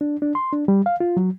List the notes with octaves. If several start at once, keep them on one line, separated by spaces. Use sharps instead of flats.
D4
D4
C6
D4
G3
F5
F4
F#3